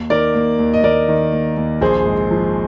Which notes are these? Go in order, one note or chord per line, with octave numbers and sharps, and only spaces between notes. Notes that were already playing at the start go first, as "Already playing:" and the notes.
Already playing: D#2
D#3 A#4 D5
A#3
D#2
D#5
D#2 A#4 D5
D#3
A#3
D#2
A#1 G#4 C5
G#2
F3